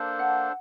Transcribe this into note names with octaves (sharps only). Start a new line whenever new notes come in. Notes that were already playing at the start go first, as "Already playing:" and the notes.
Already playing: A#3 D4 A4 C5
F#5